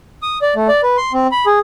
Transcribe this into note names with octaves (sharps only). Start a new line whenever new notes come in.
D#6
D5
A3
D5
B4
C6
C4
B5
G#4